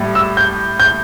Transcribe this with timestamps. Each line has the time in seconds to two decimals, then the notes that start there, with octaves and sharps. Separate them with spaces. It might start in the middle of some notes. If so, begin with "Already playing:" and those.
Already playing: A2 G3
0.15 E6
0.37 G6
0.80 G6